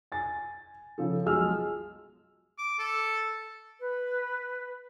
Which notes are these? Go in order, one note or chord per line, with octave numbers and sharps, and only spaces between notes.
G#5 A6
C#3 F3 A4
B1 F3 G#3 G#4 E6 F6
D6
A4
B4